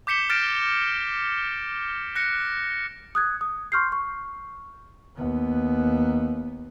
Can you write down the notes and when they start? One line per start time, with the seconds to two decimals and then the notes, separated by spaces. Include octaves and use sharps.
0.07 D6 G6 B6 C#7 E7 G7
0.29 F6 G6 A6 A#6 D7 E7
2.16 F#6 A#6 C#7
3.15 D#6 F#6 G#6
3.41 D#6
3.72 C6 C#6 F6 G6 C7
3.92 C#6
5.15 D#2 B3